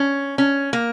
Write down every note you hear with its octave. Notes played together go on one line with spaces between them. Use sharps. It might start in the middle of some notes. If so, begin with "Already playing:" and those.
Already playing: C#4
C#4
A#3